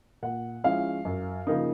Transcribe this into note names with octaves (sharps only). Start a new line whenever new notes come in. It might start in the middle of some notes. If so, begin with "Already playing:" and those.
A#2 F#5
F3 G#3 C#4 E4 F5
F#2
C#3 F3 A#3 D#4